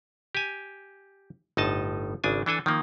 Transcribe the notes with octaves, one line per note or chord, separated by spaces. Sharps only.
G4 G#5
G1 A2 D#4 D#5 A5
G#1 C#3 D4 G#5
E3 D4 A4 G#5
D#3 F3 A#3